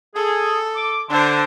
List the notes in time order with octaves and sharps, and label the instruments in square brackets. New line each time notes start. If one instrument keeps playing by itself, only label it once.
[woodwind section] G#4 [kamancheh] A4
[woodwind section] D6
[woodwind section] D3 [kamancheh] D4 C5